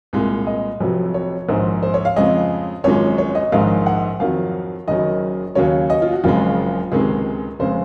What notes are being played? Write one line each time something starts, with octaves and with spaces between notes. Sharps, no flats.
C2 A#2 G#3
D#5
F1 F2 C3 F#3
C#5
A#1 G#2 D#3 C5
C5
C#5
F5
F2 C#3 G#3 D#5
G#1 F#2 F3 G#3 C#5
C#5
D#5
A#1 G#2 D#3 G#3 F5
F#5
F2 D#3 F#3 F5
F#1 F#2 D#3 F#3 D#5
D#2 C#3 F#3 C#5
D#5
F4
F#4
F#1 F2 C#3 F3 G#3 F4
C#2 C3 D#3 G#3 G#4
F1 C#3 G#3 C5